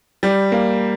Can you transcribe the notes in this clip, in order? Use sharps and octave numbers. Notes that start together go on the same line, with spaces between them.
G3
A#3